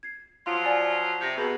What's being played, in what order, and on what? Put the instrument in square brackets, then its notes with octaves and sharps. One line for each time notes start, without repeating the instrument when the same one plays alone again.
[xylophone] G#6 C7
[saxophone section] F3 F#3 F4 [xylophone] F5 C6
[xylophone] D5 G#5 A6
[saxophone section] C3 [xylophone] G6 A#6
[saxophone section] B2 [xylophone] G#4 A#5